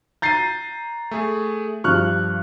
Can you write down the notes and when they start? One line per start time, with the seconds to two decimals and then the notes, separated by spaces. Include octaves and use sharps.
0.22 A#5 G6 A6 C7 D#7
1.11 A3 G#4
1.84 G2 F3 C#6 F6 F#6